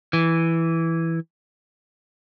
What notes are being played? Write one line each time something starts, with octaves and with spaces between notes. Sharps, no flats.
E3